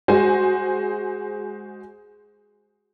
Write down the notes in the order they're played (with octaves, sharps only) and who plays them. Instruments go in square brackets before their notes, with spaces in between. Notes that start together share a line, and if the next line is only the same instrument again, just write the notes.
[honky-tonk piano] G#3 F#4 C5 G#5